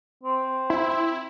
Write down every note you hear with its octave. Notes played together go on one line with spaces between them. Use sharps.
C4
E4